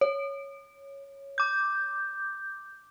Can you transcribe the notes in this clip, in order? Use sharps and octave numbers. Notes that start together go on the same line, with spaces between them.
C#5
D6 G6